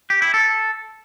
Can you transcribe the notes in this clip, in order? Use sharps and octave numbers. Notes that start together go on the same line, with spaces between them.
G4
E4
A4